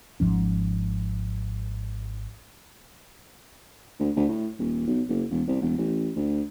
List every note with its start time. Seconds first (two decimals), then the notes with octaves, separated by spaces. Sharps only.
0.20 G#1 G#2 F3 C#4
4.00 D2
4.16 D2
4.29 A2
4.59 D#1
4.87 B1
5.09 F#1
5.31 E1
5.48 C2
5.61 E1
5.78 A1
6.16 D2